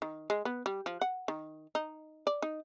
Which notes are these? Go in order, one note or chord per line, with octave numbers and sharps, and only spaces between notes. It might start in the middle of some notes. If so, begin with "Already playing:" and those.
D#3
G#3
B3
G3
F3
F#5
D#3
D#4
D5
D#4